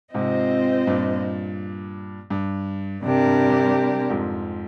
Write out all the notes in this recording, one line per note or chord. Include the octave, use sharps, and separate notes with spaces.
G#2 C3 C4 F4 C5 D#5
G2 A#2
G2
G2 C3 G3 D4 G4 A#4
G2
G2
F2 G#2